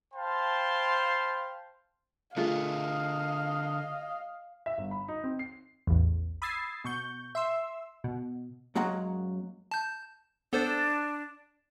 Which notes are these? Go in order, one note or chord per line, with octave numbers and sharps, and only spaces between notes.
C5 F5 G5 A5 B5 C6
D3 A3 F4 G#4 A#4 D#5 F5
E5
G1
B5
D#4
C4
C7
A1 E2
B5 D#6 E6 G#6 A6 C7
B2 C#6 G6
E5 C6 E6
B2
F#2 F#3 G#3 A#3 F#5 A#5
A5 G6
B3 D4 A4 C5